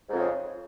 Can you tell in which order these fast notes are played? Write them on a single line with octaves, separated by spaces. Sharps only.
G#2 F2 C#3